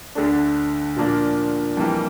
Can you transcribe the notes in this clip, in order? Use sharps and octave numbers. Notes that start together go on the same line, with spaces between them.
D2 D3 A3 D4
A#2 F3 A#3 D4
F2 E3 G3 A#3